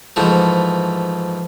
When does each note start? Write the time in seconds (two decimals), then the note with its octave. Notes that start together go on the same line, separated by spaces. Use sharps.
0.16 G#2 E3 F3 A3